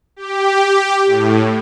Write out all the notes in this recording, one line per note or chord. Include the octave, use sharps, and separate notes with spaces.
G4
A2